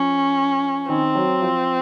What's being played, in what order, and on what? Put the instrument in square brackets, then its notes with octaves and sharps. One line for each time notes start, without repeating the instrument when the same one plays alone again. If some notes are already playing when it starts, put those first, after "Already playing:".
Already playing: [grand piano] F3 [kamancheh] C#4
[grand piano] D#3 D#4 [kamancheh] C4
[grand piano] F#3 F#4
F3 F4